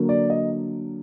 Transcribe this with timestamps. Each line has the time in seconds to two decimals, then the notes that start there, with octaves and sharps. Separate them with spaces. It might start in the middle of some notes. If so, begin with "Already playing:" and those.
Already playing: D3 F#3 A#3
0.09 D5
0.30 D#5